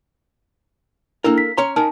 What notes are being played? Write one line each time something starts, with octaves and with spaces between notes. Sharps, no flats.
A#3 D4 E4 A4 A#4
B6
C#4 C#5 A#5 C6
C#4 D#4 A#4 A5